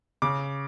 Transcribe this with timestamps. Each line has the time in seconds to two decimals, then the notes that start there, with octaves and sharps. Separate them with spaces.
0.22 C#3 D6